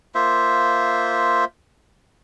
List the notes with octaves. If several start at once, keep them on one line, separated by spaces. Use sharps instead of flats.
A#3 F4 C5 E5